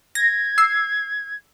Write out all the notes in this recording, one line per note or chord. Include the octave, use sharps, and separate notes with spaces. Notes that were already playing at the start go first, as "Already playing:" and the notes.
G#6 A#6
E6 C7